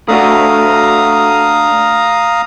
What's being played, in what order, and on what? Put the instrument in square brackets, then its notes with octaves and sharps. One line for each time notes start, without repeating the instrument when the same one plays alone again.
[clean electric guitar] A3 D4 F#4 [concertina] F5 A#5 D#6